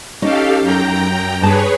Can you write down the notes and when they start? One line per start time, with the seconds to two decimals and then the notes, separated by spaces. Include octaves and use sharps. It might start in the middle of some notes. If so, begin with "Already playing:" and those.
0.22 C#4 D#4 G4 A4 F5
0.61 F#2 G5 A#5
1.41 G2 G#4 B4 C#5 A5